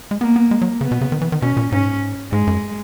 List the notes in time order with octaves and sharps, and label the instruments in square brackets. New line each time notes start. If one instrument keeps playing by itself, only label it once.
[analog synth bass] G#3
[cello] A#3 [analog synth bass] B3
[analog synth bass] B3
G#3
F#3
[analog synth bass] C#3 [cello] B3
[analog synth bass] B2
C#3
D#3
E3
D#3
[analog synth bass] B2 [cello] C#4
[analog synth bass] A#2
[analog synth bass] G#2 [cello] C#4
[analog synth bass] G#2 [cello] G#3
[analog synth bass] F#2